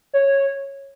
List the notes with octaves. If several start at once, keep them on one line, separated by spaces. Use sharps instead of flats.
C#5